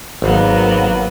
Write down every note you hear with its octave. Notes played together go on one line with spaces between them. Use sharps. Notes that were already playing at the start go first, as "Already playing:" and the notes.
G#1 F#3 A#3 B3